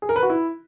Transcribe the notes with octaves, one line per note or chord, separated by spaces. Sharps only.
G#4
A#4
B4
F#4
E4